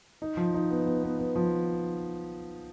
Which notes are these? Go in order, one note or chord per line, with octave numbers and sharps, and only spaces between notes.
D#4
F3
D#4
B3
B3
B3
B3
F3